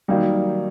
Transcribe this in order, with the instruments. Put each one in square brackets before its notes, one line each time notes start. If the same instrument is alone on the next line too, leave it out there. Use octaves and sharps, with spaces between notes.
[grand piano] D#3 F#3 A#3 D#4 [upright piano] G3